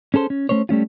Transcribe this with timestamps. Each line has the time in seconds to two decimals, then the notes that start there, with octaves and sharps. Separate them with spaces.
0.14 C#4 G#4 A4 C5
0.30 C#4
0.49 A3 C#4 C5 C#5
0.69 G3 A3 C#4 F4